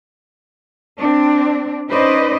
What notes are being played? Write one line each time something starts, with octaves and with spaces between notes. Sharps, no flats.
C4 D4
C#4 D#4 B4 C5 D5 D#5